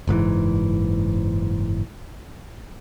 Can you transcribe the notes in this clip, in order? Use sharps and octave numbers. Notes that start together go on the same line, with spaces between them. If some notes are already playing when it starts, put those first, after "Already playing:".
F#1 G#2 C#3 E3